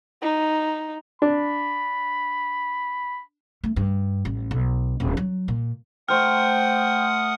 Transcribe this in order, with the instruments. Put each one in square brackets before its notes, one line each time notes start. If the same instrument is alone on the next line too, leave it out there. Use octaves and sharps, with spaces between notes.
[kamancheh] D#4
[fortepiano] D4 [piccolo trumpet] B5
[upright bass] A3
G2
A1
B1
D#1
F#3
A#2
[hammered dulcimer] A3 C5 A#5 [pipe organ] F#5 D#6 [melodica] G5 [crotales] F6